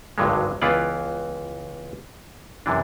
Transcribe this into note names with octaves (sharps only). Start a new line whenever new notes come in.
G#1 C#2 G2 D3 F#3 G#3
C#2 E3 B3 F4 D5
F#2 C3 E3 D4